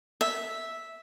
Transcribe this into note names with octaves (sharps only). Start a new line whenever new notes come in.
E5